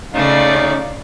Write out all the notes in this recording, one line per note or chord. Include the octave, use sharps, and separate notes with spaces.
C#3 A3 C#4 D#4 D5 F5